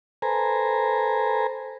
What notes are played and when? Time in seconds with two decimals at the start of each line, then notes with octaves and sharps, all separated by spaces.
0.22 A4 B4 C5 G#5 A#5